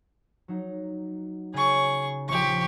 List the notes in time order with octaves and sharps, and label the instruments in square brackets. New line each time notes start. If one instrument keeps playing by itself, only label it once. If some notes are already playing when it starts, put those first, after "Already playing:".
[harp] F#3 D#4
[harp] C#3 A6 [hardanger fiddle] G#4 C#6
[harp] A#1 F3 [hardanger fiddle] G4 C#6